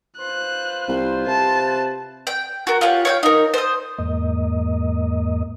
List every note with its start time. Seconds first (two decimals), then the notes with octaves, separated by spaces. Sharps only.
0.18 F4 B4 C5 F#6
0.88 C2
1.27 C3 A5
2.27 G5
2.67 F#4 A#4
2.81 F4 G4 C#5 F#5
3.05 C#5 F5 G5
3.23 D#4 A#4
3.54 C5 D#6
3.99 E2 G#2 A#3 D#5